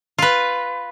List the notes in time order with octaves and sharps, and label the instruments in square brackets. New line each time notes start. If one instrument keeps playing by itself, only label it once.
[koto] F4 B4